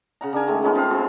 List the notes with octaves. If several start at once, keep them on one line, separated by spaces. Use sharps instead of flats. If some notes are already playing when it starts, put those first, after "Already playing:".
C#3 F#5 A#5
C#3 D4 A#4 G#5
D#3 G#3 A3
B3 C#4 D#4 F4
F3 B3 F5
B3 F4